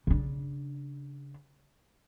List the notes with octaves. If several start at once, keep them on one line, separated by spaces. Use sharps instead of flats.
C#3 D4